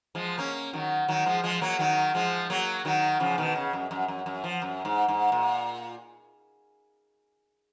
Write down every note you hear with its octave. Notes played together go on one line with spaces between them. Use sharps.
F3 G#3
A#3 C#4
D#3 F#3
D#3 F#3
F3 G#3
F3 G#3
F#3 A#3
D#3 F#3
F3 G#3
F#3 A#3
D#3 F#3
C#3 F3
B2 D#3
C#3
F#2
F#2
F#2
F#2
F3
F#2
G#2
G#2
A#2